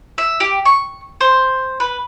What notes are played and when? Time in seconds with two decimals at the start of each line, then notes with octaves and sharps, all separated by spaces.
0.18 E5
0.40 G4
0.65 C#6
1.21 C5
1.80 B4